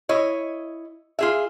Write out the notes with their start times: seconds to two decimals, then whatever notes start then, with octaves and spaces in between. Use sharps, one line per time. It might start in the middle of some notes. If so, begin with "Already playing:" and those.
0.09 E4 C#5 D#5
1.19 F4 G#4 E5